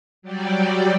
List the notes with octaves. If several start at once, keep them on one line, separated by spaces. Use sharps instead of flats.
F#3 G3 G4 D5